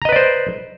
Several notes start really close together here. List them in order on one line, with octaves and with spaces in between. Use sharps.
A#5 D#5 B4 D5 C5